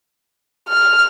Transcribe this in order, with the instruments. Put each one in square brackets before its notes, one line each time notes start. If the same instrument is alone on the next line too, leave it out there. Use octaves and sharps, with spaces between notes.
[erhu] F6